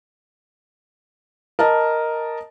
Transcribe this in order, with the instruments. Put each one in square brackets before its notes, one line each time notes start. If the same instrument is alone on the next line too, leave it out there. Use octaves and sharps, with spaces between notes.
[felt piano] A#4 D#5 A5